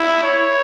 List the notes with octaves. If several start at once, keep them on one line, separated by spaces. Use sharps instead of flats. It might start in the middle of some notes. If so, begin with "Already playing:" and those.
Already playing: E4
C#5